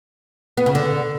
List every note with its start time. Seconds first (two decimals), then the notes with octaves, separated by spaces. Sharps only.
0.57 B3
0.66 C#3
0.75 D3